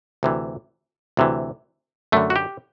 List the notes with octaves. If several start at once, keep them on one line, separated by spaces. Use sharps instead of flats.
D2 C3 E3
D2 C3 E3
F#2 D3 A3
F#4
G4